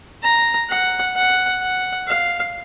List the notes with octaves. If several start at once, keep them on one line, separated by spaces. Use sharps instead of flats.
A#5
F#5
F#5
F#5
F5